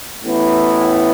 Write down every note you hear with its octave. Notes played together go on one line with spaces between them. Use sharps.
A1 A2 E3 B3 E4